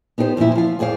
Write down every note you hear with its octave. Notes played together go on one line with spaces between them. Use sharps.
B3 D#4 G4 A#4 C5
E2 A#2 E3 F3 E4
F3 F5
F2 G#4 C5 D5 F5